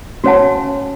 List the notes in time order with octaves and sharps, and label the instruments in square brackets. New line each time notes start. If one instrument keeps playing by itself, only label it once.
[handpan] C#4 [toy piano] F#4 C#5 F#5 A5